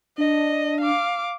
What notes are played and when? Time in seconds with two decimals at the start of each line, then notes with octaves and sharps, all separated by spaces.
0.18 D4 D#5
0.81 F5 D6